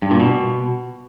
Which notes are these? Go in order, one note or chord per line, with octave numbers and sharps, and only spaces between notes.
G2
A#2
B2